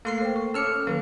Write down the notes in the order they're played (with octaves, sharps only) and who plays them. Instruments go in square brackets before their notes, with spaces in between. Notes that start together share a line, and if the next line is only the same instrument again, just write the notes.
[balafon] A3 A4 [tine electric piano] A#3 C6 C7
[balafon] C5 G5
C#6
[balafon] C#4 C#5 D6 [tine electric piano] E6 F6 C#7
[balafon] A4
[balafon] D#3 F#3 [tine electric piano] A#3